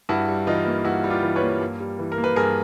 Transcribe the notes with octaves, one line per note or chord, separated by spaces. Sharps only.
G2 E4 F#4
G3
E3 D#4 F4
A#3
G2 E4 F#4
G3
F4 G4
E3
B4 C#5
A#3
G2
G3
E3
A#4
A#3
B4
G2 G#4 A#4